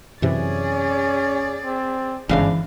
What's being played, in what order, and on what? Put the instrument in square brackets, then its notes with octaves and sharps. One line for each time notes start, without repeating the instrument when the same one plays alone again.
[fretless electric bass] F#2 C3 E3 [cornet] C#4 [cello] G#4 D5
[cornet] C4
[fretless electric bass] G1 G#2 C#3 [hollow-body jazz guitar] E3 F5 [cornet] D4